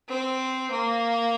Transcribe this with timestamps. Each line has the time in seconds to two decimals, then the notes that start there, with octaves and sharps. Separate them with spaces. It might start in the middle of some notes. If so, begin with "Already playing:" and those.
0.08 C4
0.71 A#3